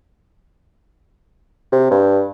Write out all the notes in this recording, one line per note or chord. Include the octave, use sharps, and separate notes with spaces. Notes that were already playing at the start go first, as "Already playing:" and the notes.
C3
G2